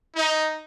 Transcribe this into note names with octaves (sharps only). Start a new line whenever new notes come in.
D#4